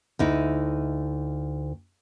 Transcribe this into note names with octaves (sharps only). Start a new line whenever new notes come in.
D2 D#4 E4